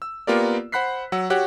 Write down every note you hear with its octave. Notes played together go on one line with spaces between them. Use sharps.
E6
A#3 B3 F4 G4 A#4 D5
C5 F#5 B5 F#6 B6 C7
F#3 F#5 E6
F#4 G4 C#5 F#5 F#6